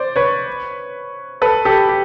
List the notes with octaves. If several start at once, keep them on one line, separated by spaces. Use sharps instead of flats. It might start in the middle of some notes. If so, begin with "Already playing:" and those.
Already playing: C5 D5
B4 C#5
A4 B4
G4 A4
G4